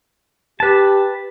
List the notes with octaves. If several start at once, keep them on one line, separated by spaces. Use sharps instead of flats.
G4 B4 A5